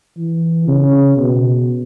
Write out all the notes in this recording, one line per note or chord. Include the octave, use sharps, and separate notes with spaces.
E3
C#3
B2